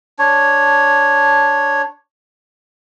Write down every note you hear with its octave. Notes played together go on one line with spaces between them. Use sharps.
D4 C#5